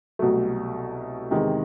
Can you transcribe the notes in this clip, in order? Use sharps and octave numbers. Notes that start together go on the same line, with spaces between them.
C2 B2 F#3 A3
E2 C3 D#3 G#3